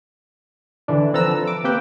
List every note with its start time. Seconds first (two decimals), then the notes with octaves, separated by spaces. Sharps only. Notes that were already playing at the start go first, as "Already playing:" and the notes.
0.88 D3 E3 D4
1.13 F3 C4 A4 B4 A#5 E6
1.47 D6
1.64 A#3 C4 G4 B4 C5 G5